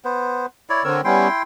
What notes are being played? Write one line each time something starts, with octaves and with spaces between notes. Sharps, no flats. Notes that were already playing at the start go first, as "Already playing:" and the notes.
B3 C5
E4 C#5 D5
D3 C4 A#4 C#5 E6
G3 B3 C#4 E4 G5 C6